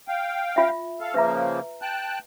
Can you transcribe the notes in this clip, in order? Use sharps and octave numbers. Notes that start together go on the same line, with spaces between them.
F5 G5
F4 E5
A4 F5
C#3 F3 A#3 B4 E5 A#5
G5 A5 F#6